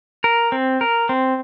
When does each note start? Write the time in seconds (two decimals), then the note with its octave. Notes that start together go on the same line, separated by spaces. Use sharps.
0.24 A#4
0.52 C4
0.81 A#4
1.09 C4